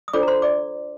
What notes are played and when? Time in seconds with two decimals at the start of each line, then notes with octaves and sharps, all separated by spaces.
0.08 D#6
0.13 D4 F4 A4 C5 D5 D6
0.23 A#5
0.28 C5 C6
0.42 D5 D6